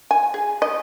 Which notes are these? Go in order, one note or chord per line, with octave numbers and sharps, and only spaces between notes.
G#5
G#4
D#5